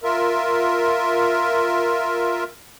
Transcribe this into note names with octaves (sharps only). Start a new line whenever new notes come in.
F4 A#4 E5